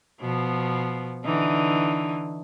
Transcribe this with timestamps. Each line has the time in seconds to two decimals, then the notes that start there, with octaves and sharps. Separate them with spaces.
0.21 B2 F3 B3
1.25 D3 E3 D#4